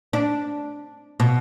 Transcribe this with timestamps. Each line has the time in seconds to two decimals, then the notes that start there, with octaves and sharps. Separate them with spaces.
0.13 D4
1.20 B2